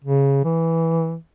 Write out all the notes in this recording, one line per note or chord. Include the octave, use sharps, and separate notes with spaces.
C#3
E3